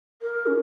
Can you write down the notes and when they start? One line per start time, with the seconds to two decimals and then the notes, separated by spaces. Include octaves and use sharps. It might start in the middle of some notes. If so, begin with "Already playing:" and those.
0.22 A#4
0.47 C#4